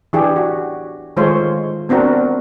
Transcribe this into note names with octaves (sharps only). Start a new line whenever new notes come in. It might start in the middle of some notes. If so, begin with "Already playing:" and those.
E3 D4 G4 G#4
F#4
D#3 G#3 A3 F4 C5 C#5
B3 C4 D4 F#4 A#4